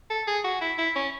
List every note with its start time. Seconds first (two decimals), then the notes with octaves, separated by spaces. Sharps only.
0.10 A4
0.27 G#4
0.44 F#4
0.61 E4
0.78 E4
0.96 C#4